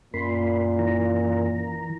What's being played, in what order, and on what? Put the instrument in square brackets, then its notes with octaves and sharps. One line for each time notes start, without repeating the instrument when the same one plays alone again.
[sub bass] F#2 [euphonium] A#2 [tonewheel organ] A#3 B5 C6
[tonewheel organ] E3 A#5